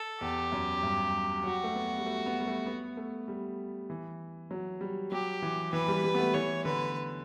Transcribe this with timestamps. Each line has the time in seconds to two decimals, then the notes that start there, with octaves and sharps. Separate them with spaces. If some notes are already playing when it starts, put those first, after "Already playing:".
Already playing: A4
0.21 E2 G4
0.52 F#2
0.83 G2
1.44 F#3 F#4
1.64 A3
1.75 B3
1.98 G3
2.06 A3
2.26 B3
2.40 G3
2.47 A3
2.66 B3
2.97 A3
3.28 G3
3.90 E3
4.51 F#3
4.81 G3
5.12 F#3 G4
5.42 E3
5.73 E3 B4
5.88 G3
6.04 G3
6.14 B3
6.18 A3
6.34 E3 C#5
6.65 D3 B4